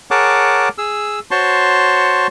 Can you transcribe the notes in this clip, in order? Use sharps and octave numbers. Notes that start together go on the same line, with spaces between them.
G#4 A#4 C#5 F#5 A5 D6
G#4 E6
F#4 C5 C#5 A5 C6 C#6